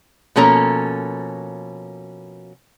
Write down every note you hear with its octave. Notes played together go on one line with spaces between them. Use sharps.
B2 F3 A#3 C#4 A4 A#5